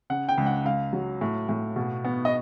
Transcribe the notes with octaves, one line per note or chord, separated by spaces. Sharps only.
C#3 F#5
G5
C#2
F#5
C#2 F5
F#3
A2
A2
B2
B3
D#5